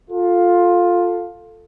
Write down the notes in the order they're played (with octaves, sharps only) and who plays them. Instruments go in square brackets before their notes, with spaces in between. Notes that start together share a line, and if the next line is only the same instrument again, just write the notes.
[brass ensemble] F4 A4